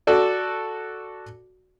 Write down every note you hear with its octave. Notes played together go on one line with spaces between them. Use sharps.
F#4 A4 D5